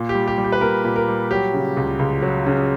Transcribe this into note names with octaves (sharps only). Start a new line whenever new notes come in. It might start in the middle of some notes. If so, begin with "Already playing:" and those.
Already playing: A#2
G4
G3
G4
G3
G4
B4
A#2 A#4
A#2
A#4
G3
F#3 G4
C#3
C#2
C#2
F#3
C#3